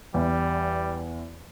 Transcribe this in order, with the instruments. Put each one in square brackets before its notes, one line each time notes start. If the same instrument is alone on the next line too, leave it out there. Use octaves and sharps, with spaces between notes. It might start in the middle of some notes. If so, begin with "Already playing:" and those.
[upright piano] E2 [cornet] G3